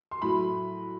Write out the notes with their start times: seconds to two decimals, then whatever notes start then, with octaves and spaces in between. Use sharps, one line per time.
0.11 C6
0.22 A2 F#3 A3 B5